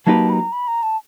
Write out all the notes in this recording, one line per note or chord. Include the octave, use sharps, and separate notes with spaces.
F#3 A#3 D#4 G4 B4 A5
B5
A#5
B5
A#5
A5